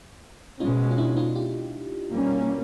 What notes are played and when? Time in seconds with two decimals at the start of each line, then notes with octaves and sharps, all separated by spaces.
0.60 B2 G#3 C#4 D#4 F4
0.91 F4
0.98 D4 E4
1.17 D#4 F4
1.35 F4 G4
2.10 B2 G3 A#3 C#4